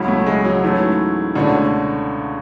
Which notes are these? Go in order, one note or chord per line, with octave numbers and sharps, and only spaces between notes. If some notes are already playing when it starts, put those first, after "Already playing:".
Already playing: C#2 C#3 F#3 C#4 E4
A3
G#3
F#3
G#2 E3 A3 C#4 E4
C#2 B2 D3 A3 C#4